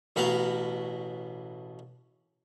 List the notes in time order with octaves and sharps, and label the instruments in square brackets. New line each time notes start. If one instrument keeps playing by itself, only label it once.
[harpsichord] A1 B2 B4 F5 A#5